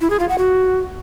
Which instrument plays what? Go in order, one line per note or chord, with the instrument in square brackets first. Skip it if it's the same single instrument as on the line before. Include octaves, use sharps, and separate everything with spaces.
[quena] E4
G#4
F4
F#5
F#4